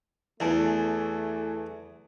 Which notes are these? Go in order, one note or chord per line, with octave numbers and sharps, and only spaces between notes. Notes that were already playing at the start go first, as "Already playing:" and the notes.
E2 E3 A3 G#5 A5